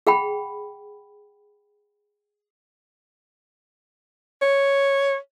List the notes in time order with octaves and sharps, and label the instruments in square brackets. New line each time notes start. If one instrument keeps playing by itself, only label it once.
[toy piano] G#4 F#5 G5 B5
[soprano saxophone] C#5